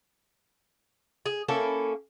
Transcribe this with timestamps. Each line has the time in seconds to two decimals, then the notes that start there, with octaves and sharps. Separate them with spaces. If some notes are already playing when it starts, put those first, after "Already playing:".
1.26 G#4
1.48 A#3 C#4 E4 A4